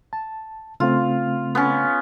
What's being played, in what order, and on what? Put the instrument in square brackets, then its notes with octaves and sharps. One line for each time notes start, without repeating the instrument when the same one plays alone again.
[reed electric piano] A5
[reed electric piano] C#3 A3 C4 [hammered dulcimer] F4
[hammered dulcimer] B3 C#4